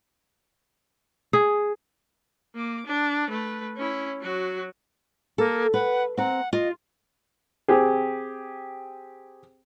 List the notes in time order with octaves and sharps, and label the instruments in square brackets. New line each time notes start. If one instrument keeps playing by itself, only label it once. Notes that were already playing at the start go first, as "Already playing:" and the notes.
[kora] G#4
[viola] A#3 D6
D4
A3 B4
C#4 E4
F#3 F#4
[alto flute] A#3 [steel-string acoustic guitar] A4
[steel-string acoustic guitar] B4 [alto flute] F#5
[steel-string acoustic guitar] C4 A#5 [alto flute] F#5
[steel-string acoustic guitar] F4 [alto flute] D#5
[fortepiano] C4 G4 G#4